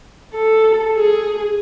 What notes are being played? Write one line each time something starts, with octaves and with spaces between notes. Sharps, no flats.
A4
G#4